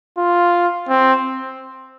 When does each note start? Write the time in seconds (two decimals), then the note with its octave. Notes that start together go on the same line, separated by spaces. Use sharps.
0.18 F4
0.89 C4